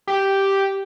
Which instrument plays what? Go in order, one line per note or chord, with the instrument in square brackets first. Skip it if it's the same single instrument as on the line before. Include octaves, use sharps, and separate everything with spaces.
[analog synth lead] G4